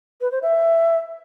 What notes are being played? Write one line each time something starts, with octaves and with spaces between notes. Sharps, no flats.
B4
C5
E5